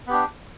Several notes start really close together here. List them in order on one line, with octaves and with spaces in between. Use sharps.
B3 G4 D4